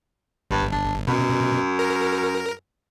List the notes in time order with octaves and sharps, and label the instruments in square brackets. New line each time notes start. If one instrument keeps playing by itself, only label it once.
[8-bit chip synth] G1 [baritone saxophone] G2
[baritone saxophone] D4
[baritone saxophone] F#2 [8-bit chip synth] B2
[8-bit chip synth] A#4